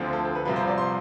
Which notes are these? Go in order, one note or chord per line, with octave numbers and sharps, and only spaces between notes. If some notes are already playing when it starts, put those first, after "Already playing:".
Already playing: D2 D3 F3 C4
A4
A4
B4
C2 C3 F3 B4
C5
D5
C6